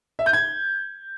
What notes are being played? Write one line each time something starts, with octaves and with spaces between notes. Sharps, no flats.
E5
G6
G#6